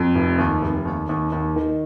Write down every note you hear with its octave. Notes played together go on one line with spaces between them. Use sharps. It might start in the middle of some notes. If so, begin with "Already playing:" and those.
Already playing: F2
F1
D#2
F1
D#2
D#2
D#2
D#3